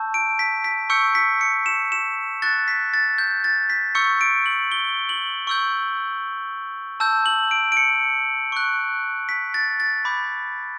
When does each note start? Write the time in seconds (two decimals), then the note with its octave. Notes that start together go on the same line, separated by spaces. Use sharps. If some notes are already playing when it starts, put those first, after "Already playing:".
Already playing: A5 C#6 E6 G6
0.14 D7
0.39 B6
0.64 B6
0.90 C#6 E6 G6 C#7
1.15 B6
1.41 C#7
1.66 E7
1.92 E7
2.42 C#6 F#6 A6
2.68 B6
2.94 A6
3.18 G6
3.44 A6
3.70 B6
3.95 C#6 E6 G6 C#7
4.21 D7
4.46 F#7
4.72 G7
5.09 F#7
5.47 C#6 E6 G6
7.00 A5 E6 G6
7.26 F#7
7.51 D7
7.72 D7
7.77 C#7
8.52 C#6 F#6
9.29 B6
9.54 A6
9.80 A6
10.05 B5 D6 G6